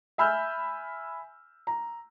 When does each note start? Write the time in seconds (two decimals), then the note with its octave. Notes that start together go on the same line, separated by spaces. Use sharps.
0.18 E5 G#5 B5 E6 F6 G6
1.67 A#5